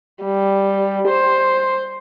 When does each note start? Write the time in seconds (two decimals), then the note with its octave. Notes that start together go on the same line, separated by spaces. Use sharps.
0.24 G3
1.08 C5